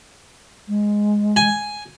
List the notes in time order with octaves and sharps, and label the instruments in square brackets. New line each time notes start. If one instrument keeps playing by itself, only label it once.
[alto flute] G#3
[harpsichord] G#5